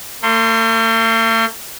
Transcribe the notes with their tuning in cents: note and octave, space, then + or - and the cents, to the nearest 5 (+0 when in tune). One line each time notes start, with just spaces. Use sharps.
A3 +45 C6 +0